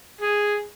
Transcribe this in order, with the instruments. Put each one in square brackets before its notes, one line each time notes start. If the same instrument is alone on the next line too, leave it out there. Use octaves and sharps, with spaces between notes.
[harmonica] G#4